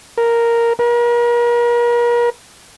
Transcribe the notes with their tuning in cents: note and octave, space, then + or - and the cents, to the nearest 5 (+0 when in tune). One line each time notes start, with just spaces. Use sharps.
A#4 +0
A#4 +40